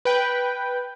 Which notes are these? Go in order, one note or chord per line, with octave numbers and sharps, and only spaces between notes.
B4 G5